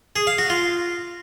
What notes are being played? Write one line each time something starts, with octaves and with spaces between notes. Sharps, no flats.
G#4
F5
F#4
F4